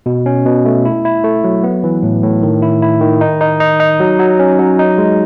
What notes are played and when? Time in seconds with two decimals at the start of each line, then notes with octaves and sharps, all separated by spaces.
0.06 B2
0.26 C#4
0.46 B2
0.65 A3
0.85 E4
1.05 E4
1.24 A3
1.44 F#3
1.64 B3
1.84 E3
2.03 A2
2.23 A2
2.43 D#3
2.62 E4
2.82 E4
3.01 D#3
3.21 D#4
3.41 D#4
3.60 D#4
3.80 D#4
4.00 F#3
4.20 F#3
4.39 C#4
4.59 F#3
4.79 D#4
4.98 G#3